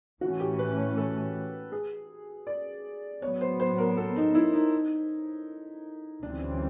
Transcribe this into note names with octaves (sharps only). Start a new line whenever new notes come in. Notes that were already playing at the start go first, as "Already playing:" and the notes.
A2 E3 A3 C#4 F#4
G4
B4
A4
G#4
D5
A2 F#3 B3 C#5
C5
C5
A#4
A4
D#4
E4
D#4
D2 C#3 E3 G3 C4 D4